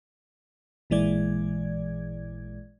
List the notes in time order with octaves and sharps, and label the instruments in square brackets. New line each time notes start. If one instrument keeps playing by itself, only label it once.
[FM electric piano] A1 A#2 E3 G#3 D5 G#6